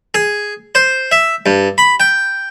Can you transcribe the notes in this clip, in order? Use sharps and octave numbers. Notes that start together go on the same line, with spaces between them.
G#4
C5
E5
G2
B5
G5